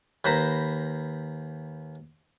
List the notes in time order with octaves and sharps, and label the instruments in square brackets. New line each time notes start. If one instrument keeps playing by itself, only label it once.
[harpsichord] D#2 B4 C5 A#5 B5